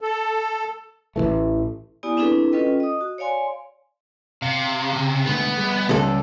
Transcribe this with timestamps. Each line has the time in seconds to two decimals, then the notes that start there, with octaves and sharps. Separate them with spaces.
0.01 A4
1.16 A1 D#3 E3 A3
2.03 B3 E4 G4 D5 G#5 D#6
2.17 C4 D4 E4 G#4 A4 B4
2.52 C#4 F4 A4 B4 D#5 G5
2.80 D#5 D#6
3.01 F#4
3.18 C#5 D5 F5 G#5 C6
4.42 C3 F5
4.93 C#3
5.26 D3 G#3 A3 B3
5.57 G3 G#4
5.89 C#2 A4